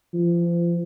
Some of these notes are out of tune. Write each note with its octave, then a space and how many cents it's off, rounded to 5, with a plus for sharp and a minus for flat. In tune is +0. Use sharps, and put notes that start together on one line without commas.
F3 -30